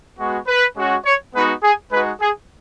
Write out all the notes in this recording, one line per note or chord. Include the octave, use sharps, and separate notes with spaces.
G#3 B3 F#4
B4
G#3 C#4 F#4
C#5
G#3 B3 D#4 F#4 B4
G#4
G#3 D#4 F#4 B4
G#4